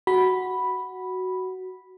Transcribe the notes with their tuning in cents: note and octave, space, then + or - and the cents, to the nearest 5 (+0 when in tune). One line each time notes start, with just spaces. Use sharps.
F#4 +5 B5 -5